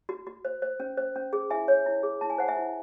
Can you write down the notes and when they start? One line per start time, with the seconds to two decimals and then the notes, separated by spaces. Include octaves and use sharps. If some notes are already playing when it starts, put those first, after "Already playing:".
0.09 F#4
0.27 F#4
0.45 C5
0.62 C5
0.80 C#4
0.97 C5
1.16 C#4
1.33 G#4
1.50 E4 E5 G#5
1.68 C#5
1.86 E4
2.03 G#4
2.21 E4 A5
2.30 G#5
2.38 C5 F#5
2.48 E5 G#5
2.57 E4